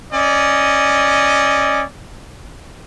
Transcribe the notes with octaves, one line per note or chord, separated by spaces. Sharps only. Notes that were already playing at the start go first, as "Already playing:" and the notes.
C#4 D5 D#5